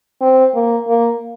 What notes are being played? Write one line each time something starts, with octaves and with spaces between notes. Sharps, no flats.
C4
A#3
A#3